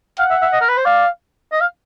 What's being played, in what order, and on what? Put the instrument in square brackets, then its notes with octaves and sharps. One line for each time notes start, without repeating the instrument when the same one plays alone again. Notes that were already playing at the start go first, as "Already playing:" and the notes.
[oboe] F5 [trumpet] F#5
[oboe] E5
E5
D#5
A#4
B4
C5
[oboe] D5 [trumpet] F5
[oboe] D#5
F5